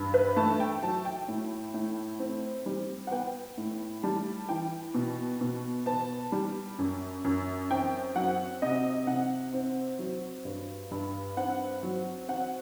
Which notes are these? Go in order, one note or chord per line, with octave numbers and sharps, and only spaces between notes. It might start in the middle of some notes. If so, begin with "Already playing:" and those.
Already playing: G2
B4
A3 A5
G5
F#3 A5
G5
A2
A2
C4
G3
F#5
B3 G5
A2
G3 A5
E3 G5
B2
B2
B3 A5
G3
F#2
F#2
C4 G5
F#3 F#5
C3 D#5
C3 F#5
C4
F#3
G2
G2
C4 F#5
F#3
C4 F#5